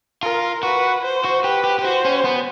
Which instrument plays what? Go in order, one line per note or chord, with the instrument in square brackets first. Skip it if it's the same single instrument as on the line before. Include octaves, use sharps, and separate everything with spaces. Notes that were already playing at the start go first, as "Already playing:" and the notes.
[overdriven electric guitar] F4 [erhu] A#4
[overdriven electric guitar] F#4 [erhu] B4
[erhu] C5
[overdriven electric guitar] F#4
[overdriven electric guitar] G4 [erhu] B4
[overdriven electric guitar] G4
G4
[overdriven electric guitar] F#4 [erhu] C5
[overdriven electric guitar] C#4
B3